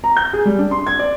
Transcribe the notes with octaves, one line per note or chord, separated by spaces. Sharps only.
A#5
G6
G#4
G3
D4
C6
G#6
D5